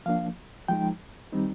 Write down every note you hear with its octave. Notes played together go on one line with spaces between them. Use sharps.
F3 A#3 D4 F5
F3 G#3 D#4 G5
D#3 G3 C4 D#4